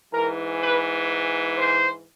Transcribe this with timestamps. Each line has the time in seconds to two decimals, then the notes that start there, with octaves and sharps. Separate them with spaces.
0.12 G#2 E3 A#4
0.61 B4
1.57 C5